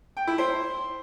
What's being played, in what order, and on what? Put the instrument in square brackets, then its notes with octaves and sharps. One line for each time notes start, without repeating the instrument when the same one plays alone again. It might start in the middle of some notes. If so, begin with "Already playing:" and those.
[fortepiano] G5
E4
C5